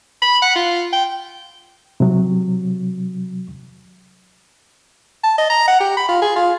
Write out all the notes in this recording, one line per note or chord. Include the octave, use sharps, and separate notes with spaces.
B5
F#5
F4
G5
C3 F#3
A5
D#5
A#5
F#5
G4
B5
F4
G#4
F4